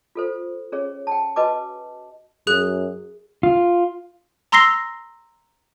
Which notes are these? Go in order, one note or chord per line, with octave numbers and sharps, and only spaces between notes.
F4 A4 C5
C#4 G#4 C#5
G5 A5
F#4 B4 D#5 G#5 A5 D6
F#2 G#4 F#6
F4
A#5 C6 E6 A#6 C7 G7